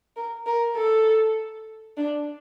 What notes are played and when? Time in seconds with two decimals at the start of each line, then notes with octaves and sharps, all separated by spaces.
0.17 A#4
0.46 A#4
0.76 A4
1.97 D4